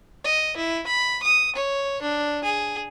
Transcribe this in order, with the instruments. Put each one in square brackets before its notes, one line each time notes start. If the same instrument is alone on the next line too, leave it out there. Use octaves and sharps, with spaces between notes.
[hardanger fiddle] D#5
E4
B5
D#6
C#5
D4
G#4